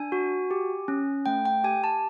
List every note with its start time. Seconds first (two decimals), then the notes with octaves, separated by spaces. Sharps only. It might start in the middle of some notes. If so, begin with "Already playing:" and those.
Already playing: D4 G#5
0.12 F#4
0.51 G4
0.88 C#4
1.26 A3 G5
1.45 G5
1.64 G4 G#5
1.84 A5